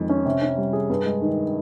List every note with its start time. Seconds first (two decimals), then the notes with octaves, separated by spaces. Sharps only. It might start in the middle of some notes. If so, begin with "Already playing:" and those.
Already playing: F2 D#3 G#3
0.09 C#4
0.25 C3
0.42 C#4
0.58 G3
0.73 G#4
0.90 G2
1.05 G#3
1.21 D#3